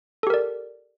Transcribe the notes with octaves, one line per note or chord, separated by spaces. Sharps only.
G4 A4 A#4 D5